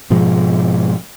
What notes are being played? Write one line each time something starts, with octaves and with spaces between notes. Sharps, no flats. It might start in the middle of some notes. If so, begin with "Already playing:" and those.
G#2 B2 F3 G#3